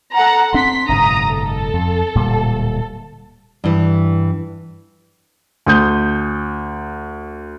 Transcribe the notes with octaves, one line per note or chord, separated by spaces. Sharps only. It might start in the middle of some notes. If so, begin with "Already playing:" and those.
A4 F#5 A#5
C4 D4 C6 B6
F#1 G#2 B2 A#5 D#6
A4
F2
D1 A#2 G3
G2 E3
D2 D#6 G6